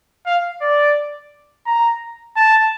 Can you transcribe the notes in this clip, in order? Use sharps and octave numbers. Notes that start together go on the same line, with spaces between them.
F5
D5
A#5
A5